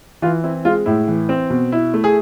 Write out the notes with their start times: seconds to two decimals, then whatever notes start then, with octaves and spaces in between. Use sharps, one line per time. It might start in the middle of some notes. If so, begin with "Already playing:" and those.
0.22 E3 F4
0.44 C4 E4
0.65 G#3 F4
0.86 A2 E4
1.08 E3
1.29 C4
1.50 B2
1.72 E4
1.94 A3
2.04 G#4